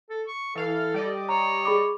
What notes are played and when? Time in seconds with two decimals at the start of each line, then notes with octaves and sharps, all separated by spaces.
0.09 A4
0.27 C#6
0.55 E3 A4 F5
0.94 G3 D5 D#5
1.29 C#5 A#5
1.65 G#4 B5 D6